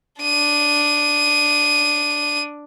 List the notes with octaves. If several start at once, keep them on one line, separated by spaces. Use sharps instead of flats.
D4 D#7